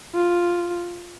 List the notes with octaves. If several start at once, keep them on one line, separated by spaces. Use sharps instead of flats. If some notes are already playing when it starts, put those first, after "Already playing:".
F4